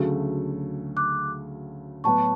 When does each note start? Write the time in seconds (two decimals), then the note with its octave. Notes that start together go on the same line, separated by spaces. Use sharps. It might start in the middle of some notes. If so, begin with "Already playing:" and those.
Already playing: D2 C#3 F#3 A3
0.97 D6 F#6
2.04 A2 F#3 B3 F#4 A5 C#6